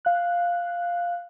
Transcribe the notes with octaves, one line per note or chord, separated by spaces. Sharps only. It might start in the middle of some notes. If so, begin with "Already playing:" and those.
F5 F#6